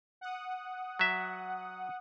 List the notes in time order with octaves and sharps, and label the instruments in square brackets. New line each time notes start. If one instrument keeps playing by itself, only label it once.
[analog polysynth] F#5 D#6
[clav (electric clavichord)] F#3 E5